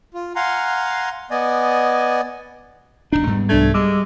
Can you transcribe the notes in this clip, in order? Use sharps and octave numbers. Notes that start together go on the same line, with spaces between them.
F4
F5 F#5 G#5 A#5 C6
B3 D5 D#5 G#5
F1 D#2 D4 D#4
G#2 G3 B3
C2 A3 D4 G#6
G3 G#3 D6 E6